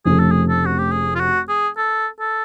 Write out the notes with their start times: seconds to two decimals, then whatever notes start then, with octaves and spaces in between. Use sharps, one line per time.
0.05 F1 F2 C#3 F3 A3 G#4
0.19 A4
0.31 G#4
0.49 A4
0.66 F#4
0.78 G4
0.91 G#4
1.15 F4
1.20 F#4
1.48 G#4
1.77 A4
2.20 A4